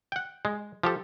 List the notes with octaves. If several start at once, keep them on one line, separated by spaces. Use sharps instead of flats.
F#5 G5
G#3
F3 G4 A4